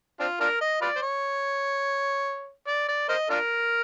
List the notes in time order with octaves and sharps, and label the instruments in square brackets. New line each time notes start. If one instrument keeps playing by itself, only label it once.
[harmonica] C4 D4 F4
D4 F4 A#4
D#5
F4 B4 D5
C5
C#5
D5
D5
A#4 C5 D#5
D4 F4 A#4